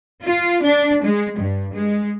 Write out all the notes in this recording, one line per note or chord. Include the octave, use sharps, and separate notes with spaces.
F4
D4
G#3
G2
G#3